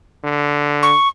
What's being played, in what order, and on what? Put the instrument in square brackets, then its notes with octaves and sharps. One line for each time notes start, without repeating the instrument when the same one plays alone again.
[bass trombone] D3
[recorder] C#6